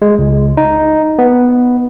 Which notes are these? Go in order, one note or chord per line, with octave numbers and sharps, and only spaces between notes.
G#3
C#2
D#4
B3